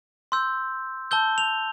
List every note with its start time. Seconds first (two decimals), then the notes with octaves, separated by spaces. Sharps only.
0.32 C6 E6 G6
1.11 A5 E6 G6 G7
1.38 F7